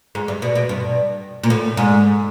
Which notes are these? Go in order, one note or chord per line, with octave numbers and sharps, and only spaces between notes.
G#2
G2
B2
B2
G2
A#2
A2
G#2